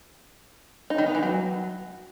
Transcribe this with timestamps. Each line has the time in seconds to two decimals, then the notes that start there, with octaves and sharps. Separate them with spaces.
0.90 D#4
0.98 D#3
1.06 B3
1.15 E3
1.23 F#3